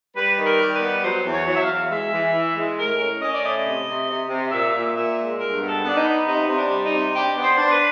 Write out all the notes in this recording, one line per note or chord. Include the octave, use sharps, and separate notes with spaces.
G3 B4
D#3
A#4
G3
B4
B3
F#3 C5
E2
C#5
F#3
E5
F5
E2
G#3 E5
E3
E3
G#3
A2 A#4
C#4
C#4 D#5
D5
A2 D#5
C3
C3
C3
C3
A#2 E5
A#2
A#2 E5
G#3
G2 A#4
B3
A4
B3 D4
D#4
B3
C3 D#4
C3
D4
G3
D#4
C3
D4 G4
B3
C5
D4
C5
B4